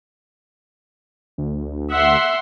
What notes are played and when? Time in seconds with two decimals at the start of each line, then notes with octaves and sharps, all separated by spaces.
1.38 D2
1.91 E5 F#5 C6